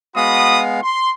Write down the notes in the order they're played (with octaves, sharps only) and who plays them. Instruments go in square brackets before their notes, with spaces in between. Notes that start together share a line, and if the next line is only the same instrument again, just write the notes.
[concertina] G#3 B3 F5 [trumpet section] F#4 B5 D#6
[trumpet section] C6